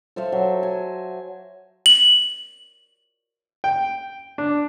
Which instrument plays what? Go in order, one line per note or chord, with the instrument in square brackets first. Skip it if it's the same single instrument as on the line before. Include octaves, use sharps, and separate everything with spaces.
[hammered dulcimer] A4 C5 E5 F5
F#3
G#5
[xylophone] F#7
[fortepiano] G5
D4